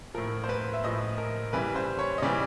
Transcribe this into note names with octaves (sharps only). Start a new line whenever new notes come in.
A2 F3 A#4
C5
B4
E5
A2 F3 D#5
A#4
C#3 E3 G3 B4
C5
C#5
D#5
C#3 E3 G3 D5